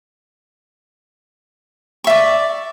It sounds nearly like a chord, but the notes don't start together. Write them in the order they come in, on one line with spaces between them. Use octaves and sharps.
C#6 E5 D5